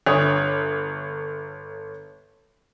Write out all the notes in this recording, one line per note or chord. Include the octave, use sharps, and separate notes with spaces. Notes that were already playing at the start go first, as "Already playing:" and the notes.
G1 C#5 D#6